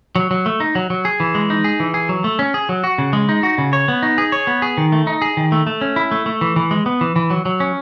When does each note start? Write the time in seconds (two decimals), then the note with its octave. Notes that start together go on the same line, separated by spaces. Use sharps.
0.16 F#3
0.31 F#3
0.46 A3
0.60 D#4
0.75 F#3
0.90 F#3
1.05 G#4
1.20 E3
1.35 G#3
1.50 D#4
1.64 G#4
1.80 E3
1.94 G#4
2.09 F#3
2.24 A3
2.39 C#4
2.54 G#4
2.69 F#3
2.84 F#4
2.98 C#3
3.13 G#3
3.29 D#4
3.43 F#4
3.58 C#3
3.73 C#5
3.88 B3
4.03 D#4
4.18 G#4
4.32 C#5
4.47 B3
4.62 G#4
4.78 D#3
4.92 A3
5.07 D#4
5.22 G#4
5.37 D#3
5.52 A3
5.67 A3
5.81 C#4
5.96 E4
6.11 A3
6.26 A3
6.41 E3
6.56 E3
6.71 G#3
6.86 B3
7.01 E3
7.16 E3
7.30 F#3
7.45 F#3
7.60 C#4